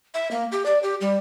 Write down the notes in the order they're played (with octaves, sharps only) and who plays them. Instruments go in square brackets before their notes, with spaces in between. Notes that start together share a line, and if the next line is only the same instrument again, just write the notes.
[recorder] E5
A#3
G4
D5
G4
G3